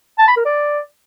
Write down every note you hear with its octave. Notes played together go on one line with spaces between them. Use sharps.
A5
B5
A#4
D5